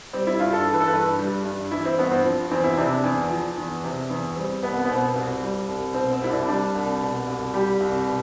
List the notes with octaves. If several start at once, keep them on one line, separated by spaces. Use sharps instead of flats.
G3 C4
E4
G2 F4
A4
E3
B4
A4
B4
G2
G3
G2
E3 E4
C4
G2 B3
C4
F3
E2 C4
E4
C3 D4
E2
F3
E2
C3
E2
G3 C4
C2 B3
B3
B2 C4
C2
G3
C2
B2 C4
C4
C2 E4
D4
G3 D4
C2
B2
C2
G3 G4
C2
B2